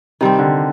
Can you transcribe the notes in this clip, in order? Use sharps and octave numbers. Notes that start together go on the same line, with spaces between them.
C3 D#3 G3 C4
D3